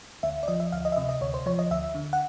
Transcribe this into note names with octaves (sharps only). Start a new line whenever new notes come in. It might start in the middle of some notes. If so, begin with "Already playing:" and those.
D2 E5
D5
F3 D#5
E5
D2 F5
D#5
E5
C3 D#5
D#5
D2 C#5
C5
F3 C#5
D#5
D2 E5
D3
F#5